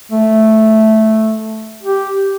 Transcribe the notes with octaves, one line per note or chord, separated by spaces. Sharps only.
A3
G4